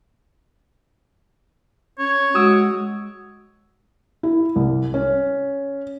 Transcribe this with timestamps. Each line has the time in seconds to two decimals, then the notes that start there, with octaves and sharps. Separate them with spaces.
1.99 C#4 C#5
2.35 G#3 F#4 D#6 E6 D7
4.23 E4
4.56 C2
4.94 C#4